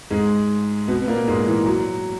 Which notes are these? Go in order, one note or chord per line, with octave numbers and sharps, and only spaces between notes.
G#2 G#3
B2 B3
B3
A#2 A#3
G#2 G#3
E3
F#3